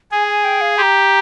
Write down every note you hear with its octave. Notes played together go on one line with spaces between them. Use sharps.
G#4 G#5
G#5
G5
F5
G4 C6
A#5